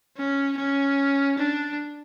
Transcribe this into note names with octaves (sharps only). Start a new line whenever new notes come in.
C#4
C#4
D4